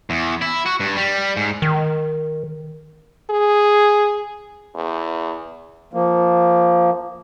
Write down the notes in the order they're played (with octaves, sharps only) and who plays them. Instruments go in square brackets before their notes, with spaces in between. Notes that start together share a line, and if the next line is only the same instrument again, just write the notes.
[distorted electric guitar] E2
E4
F#4
G2
G3
G#2
[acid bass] D#3
[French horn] G#4
E2
[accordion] F3 A#3